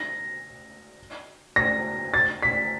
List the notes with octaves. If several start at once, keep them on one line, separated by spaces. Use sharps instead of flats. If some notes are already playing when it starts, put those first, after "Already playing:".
Already playing: A#6
A#6
A6
B6